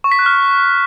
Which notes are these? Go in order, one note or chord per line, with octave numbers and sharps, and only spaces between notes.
C#6
B6
F#6
F6